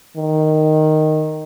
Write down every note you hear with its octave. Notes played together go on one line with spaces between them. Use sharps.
D#3